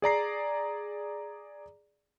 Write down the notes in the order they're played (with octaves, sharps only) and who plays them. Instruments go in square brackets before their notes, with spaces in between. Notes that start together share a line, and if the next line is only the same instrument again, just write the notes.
[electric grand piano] G#4 D5 A#5 C7